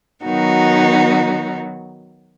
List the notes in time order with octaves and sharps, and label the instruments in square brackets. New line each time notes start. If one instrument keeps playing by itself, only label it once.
[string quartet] D#3 F#3 B3 D#4 F#4